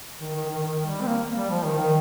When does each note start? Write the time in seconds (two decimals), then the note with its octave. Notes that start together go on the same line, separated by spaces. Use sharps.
0.21 D#3
0.35 D#3
0.50 D#3
0.63 D#3
0.85 G3
1.01 C4
1.06 A#3
1.36 G3
1.50 F3
1.64 D#3
1.78 D#3